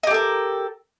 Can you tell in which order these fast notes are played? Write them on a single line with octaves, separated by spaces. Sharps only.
D#5 G4 A4 A#4